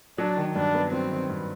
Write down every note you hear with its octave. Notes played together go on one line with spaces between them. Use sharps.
F#3 D4
D#3
G2 D4
B3
F#3 C4
D#3
G2